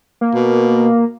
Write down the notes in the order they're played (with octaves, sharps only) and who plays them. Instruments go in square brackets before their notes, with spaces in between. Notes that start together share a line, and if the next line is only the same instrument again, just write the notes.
[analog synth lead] A#3
[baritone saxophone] B2